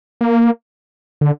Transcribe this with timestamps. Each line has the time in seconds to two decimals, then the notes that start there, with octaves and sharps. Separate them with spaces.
0.21 A#3
1.21 D3